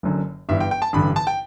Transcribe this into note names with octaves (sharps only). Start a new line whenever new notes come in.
F#1 F#2 D3
G1 G2 E3 E5
G5
G5
A5
A1 G2 D3 B5
A5
G5